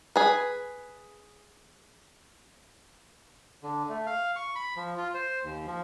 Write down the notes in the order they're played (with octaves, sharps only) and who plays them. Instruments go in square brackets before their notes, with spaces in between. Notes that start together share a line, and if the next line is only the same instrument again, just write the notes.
[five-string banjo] G#4 B4
[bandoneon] D3
A3
F5
C#6
B5
F3
F4
C5
D#2
F3